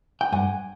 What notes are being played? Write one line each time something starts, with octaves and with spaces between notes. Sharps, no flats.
G5
G2 F#5 G#5